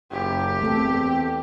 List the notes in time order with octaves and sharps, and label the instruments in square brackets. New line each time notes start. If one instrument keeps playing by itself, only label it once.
[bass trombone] F#1 [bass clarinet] F#2 [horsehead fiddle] G4
[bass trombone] E2 [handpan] A3 A4 [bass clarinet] C4